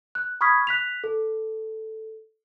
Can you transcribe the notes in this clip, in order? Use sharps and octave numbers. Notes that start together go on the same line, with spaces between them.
F#6
B5 C#6 D#6 F6 G#6 B6
F#6 B6 F7
A4